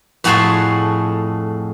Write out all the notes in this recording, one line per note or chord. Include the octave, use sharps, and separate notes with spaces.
F2 A2 F#4 G#4 A5 C6